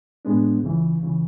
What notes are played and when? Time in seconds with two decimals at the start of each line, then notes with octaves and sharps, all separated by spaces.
0.25 A2 G#3 B3 D4
0.63 C#2 C#3 E3
1.02 C#2 C#3 E3